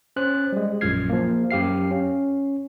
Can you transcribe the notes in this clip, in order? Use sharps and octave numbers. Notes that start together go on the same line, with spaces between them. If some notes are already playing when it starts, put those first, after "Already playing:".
C#4 C5 F#6
G3 G#3
A#1 F#2 F4 F6 G#6 C7
F3 A#3
F#2 G4 F5 C7
C#4